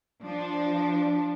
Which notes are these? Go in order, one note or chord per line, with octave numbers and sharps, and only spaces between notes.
F3 D4